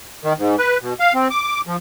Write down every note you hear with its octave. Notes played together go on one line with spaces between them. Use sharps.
D#3
G#2
B4
B2
F5
C4
D6
F3